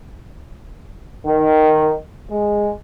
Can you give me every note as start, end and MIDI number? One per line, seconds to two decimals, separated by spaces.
1.25 1.94 51
2.30 2.69 56